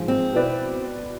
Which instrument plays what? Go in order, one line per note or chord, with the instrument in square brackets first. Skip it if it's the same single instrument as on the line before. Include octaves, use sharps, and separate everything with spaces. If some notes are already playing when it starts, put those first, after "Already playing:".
Already playing: [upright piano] G#2 F3 G#3
[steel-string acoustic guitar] C4
[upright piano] B2 B3 E4 B4 D5